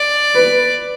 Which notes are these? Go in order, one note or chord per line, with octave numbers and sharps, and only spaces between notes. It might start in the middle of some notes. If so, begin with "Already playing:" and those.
Already playing: D5
B4